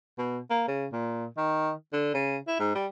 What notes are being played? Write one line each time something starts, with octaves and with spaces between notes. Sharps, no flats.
B2
A#3
C#3
A#2
D#3
D3
C#3
E4
G#2
G3